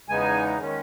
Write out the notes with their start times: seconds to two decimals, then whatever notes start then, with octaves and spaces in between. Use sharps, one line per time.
0.09 E2 C#3 G#3 B3 D#4 G#5
0.59 D#3 G#3 C#4